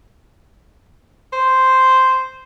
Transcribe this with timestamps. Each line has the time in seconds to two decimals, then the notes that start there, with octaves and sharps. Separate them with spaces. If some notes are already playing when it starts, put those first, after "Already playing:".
1.33 C5